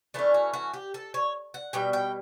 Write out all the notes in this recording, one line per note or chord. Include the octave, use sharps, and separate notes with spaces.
E3 A3 C#4 D4
F#4
F#4
G4
A4
C#5
F#5
B2 G3 G5
G5